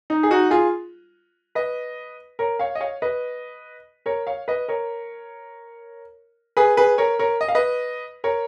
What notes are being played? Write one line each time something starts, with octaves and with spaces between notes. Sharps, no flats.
D#4
G#4
D#4 F#4
F4 G#4
B4 D#5
A#4 C#5
C#5 F5
D#5
C#5 F5
B4 D#5
A#4 C#5
C#5 F5
B4 D#5
A#4 C#5
G#4 B4
G#4 B4
A#4 C#5
A#4 C#5
D#5
F5
B4 D#5
A#4 C#5